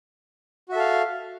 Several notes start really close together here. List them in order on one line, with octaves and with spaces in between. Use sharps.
F#4 E5 A4 F5